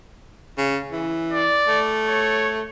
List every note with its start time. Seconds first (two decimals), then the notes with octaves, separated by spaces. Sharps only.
0.57 C#3
0.91 E3
1.33 D5
1.68 A3
2.07 C#5